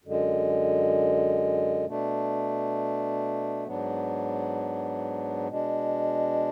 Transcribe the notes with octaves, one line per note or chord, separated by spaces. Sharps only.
F#2 D3 G#3
B2 A3 D4
G#2 F#3 B3 D4
B2 G#3 D4